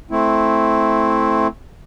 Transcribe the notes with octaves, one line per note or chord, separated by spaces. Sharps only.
A3 C4 E4